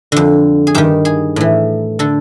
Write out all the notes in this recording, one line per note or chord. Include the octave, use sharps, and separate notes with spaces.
F2 D3
G#4
G2 D#3 G4
G#4
A2 E3
D3 A4